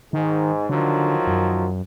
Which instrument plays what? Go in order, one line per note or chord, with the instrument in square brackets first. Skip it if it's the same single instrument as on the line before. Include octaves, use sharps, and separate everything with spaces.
[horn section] G#2 [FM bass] D#3
[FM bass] D3 [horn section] D#3 F3 F#3
[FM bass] F#2